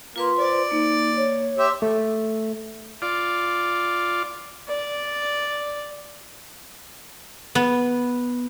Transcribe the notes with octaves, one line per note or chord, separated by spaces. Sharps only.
A#3 F4 B4 C6
C5 D5
A#3 D#4
C#5
G4 E5 C6
A3
F4 D5
D5
B3